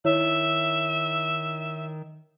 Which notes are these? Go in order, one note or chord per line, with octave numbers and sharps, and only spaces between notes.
D#3 E4 C#5 E5